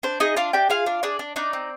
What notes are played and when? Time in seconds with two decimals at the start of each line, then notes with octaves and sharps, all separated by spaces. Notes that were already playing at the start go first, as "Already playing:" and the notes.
0.03 D4 C5
0.20 D#4 G#4 D#5
0.36 D4 F4 F5
0.53 D4 G4 G5
0.70 F4 G#4 F5
0.86 D4
1.03 D4 G#4 D5
1.19 D4
1.36 D4 D#4 D5
1.53 C4